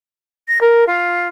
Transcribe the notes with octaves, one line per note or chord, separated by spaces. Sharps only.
A#6
A#4
F4